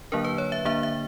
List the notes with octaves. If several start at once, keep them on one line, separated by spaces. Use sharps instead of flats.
D3 F#3 A#3 D4 A#4
B4
C#5
E5
D3 A#3 D4 E5
E5